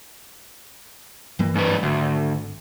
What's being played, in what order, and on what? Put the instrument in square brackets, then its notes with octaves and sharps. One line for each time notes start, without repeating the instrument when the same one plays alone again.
[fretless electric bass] G2 E3 A#3
[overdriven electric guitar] G#2 B4
[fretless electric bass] G#1 [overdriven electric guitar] D2